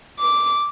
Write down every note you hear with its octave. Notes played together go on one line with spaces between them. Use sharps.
D6